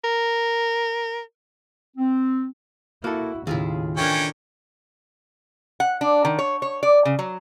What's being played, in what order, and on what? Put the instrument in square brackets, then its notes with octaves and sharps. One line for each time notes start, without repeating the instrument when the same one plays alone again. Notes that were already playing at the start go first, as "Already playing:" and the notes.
[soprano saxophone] A#4
[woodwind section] C4
[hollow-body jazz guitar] A#3 A4 [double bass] E4 [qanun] F#4
[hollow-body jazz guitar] D#2 [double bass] A2 C#3 [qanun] E4 F4 G#4
[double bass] D#3 D4 [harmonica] E3 C#4 G5 [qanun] A4 A#4
[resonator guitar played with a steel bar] F#5
D4
D#3
C#5
C#5
D5
C#3
F#3